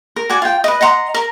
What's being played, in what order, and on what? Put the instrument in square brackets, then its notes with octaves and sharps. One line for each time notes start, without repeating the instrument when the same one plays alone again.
[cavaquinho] A#4
F#4 D5 G#5
F4 G5
B4 D#5
D#5 F#5 A#5 C6
A#4